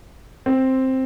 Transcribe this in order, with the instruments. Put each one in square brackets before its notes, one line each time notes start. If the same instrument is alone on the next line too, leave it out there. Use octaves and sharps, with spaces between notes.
[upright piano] C4